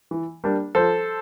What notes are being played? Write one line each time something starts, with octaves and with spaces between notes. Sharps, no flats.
E3
G3 A#3 D4
F3 A4 C5